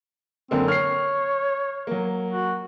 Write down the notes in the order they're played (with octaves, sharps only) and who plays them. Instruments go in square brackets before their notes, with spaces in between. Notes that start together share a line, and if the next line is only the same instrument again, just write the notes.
[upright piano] F#2 D3 A#3 [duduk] C4
[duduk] C#5 [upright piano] F6 C7
[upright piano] F#3 A#3
[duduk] F#4